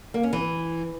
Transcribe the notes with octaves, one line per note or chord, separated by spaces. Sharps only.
A#3
C#4
E3